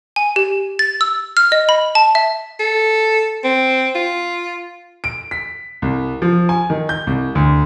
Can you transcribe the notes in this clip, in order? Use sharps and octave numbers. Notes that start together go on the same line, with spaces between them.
G#5
G4
A6
E6
F6
D#5
B5
A5
E5
A4
C4
F4
D7
B6
C2
F3
G#5
D#3
G6
C2
D2